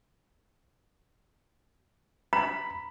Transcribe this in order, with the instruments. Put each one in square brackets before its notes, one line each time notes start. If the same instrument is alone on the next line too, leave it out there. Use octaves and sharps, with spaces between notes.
[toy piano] A#5 [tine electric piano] B5